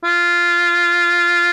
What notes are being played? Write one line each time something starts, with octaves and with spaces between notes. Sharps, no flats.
F4